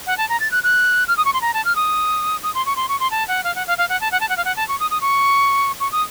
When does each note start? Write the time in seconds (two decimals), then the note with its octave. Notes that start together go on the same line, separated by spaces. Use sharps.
0.07 F#5
0.18 A5
0.29 A#5
0.40 A6
0.51 F#6
0.64 F#6
1.08 F6
1.17 D#6
1.25 C#6
1.34 C6
1.41 A#5
1.54 A5
1.65 F6
1.76 D#6
2.43 D#6
2.54 C6
2.66 C#6
2.76 C6
2.89 C#6
3.00 C6
3.11 A5
3.28 F#5
3.44 F5
3.55 F#5
3.67 F5
3.78 F5
3.89 F#5
4.01 A5
4.12 F#5
4.21 A5
4.29 F#5
4.37 F5
4.45 F#5
4.56 A5
4.68 C#6
4.80 D#6
4.91 D#6
5.01 C#6
5.80 C#6
5.92 D#6